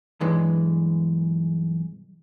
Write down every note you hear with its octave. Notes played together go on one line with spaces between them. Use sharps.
B1 G2 E3 G#3